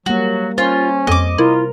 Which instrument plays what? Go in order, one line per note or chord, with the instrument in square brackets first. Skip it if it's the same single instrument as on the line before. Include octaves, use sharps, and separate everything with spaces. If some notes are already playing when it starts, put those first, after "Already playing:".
[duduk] F#3 [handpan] G3 A#3 [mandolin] F#4
[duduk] C#4 [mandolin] F4 [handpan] C5
[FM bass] F2 [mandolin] D#5 D6
[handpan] C3 A#4 [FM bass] E4 [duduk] F4